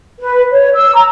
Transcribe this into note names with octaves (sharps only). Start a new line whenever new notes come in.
B4
C#5
E6
A#5